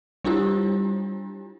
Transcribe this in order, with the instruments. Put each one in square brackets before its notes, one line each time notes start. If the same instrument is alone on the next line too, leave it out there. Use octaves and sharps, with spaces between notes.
[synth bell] G3 D4 E4 F4 G4